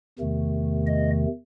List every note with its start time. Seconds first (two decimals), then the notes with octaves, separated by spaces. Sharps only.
0.19 E2 C3 D#3 A3
0.87 D#5